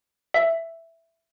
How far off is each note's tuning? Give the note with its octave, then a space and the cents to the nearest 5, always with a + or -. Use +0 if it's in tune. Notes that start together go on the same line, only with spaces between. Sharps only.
E5 +5